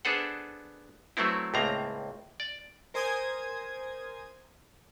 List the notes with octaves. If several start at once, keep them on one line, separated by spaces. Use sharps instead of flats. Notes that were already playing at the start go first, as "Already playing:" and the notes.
B3 D4 G#4 A4 C5 F#5
F#3 A3 B3 C4 E4
C#2 A2 A#3 C4 A#5
D5
A#4 C5 G#5 D#6 G#6